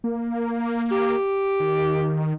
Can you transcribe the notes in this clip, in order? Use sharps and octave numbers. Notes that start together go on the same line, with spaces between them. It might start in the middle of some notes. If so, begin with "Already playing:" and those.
A#3
G4
D#3